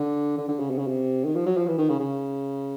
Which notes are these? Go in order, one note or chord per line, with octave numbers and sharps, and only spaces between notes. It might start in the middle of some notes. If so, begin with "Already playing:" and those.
Already playing: D3
D3
D3
C#3
C3
C#3
C3
D#3
F3
F#3
F3
E3
D#3
C#3
C#3